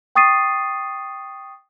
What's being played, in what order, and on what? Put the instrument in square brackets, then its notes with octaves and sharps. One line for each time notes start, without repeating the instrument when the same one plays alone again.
[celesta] G5 C#6 D#6 A6 C7 D#7